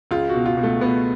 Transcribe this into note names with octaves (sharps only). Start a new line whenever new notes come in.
C#2 F4
F#4
B2
F4
B2
A3
B2 B3